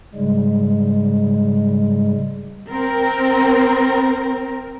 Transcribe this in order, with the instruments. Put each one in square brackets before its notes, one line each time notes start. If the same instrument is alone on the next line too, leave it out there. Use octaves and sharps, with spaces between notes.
[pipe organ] G#2 C#3 G3 G#3
[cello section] C4 A#4